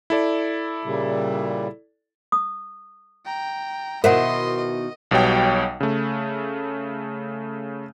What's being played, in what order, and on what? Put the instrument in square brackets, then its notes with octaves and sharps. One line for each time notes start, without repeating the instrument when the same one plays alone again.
[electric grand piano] E4 A4 D5
[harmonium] A#2 C#3 G3
[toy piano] D#6
[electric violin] G5 A#5
[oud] B2 D#3 E4 [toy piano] A#4 C5 F#5 [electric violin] D#5 C6
[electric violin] D#5
[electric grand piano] B1 B2 G3 C#5 G5
C#3 A3